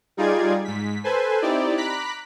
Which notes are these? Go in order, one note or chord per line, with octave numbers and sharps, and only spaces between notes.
G3 D#4 F4 G#4 D5 G#6
G#2 B6
A4 B4 C5 G#5
C4 D#4 E4 G4 D5
A#5 B5 D6 F#6 B6